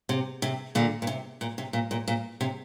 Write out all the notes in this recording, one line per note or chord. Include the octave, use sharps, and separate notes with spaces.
C3
C3
A#2 D3
A#2
C3
A#2
C3
A#2
A#2
A#2
C3